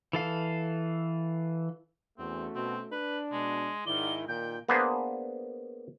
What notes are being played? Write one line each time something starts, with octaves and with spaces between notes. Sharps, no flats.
E3 A4 F5
E2 A3 C4 C#4 F#4
B2 C4
D4 B4
B2 G#3
G#2 D#3 E4 D5 G7
A#2 D#3 G5 G6
A#3 B3 D4 G#4 B4 C5